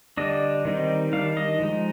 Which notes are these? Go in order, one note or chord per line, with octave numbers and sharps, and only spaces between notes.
D3 G3 D4 D#5
D#3 G3 C4 D#4
D#3 G3 D4 F5
D#5
F3 G#3 D#4